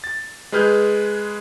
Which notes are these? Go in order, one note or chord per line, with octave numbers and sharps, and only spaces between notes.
A6
G#3 G#4 B4 F6 G6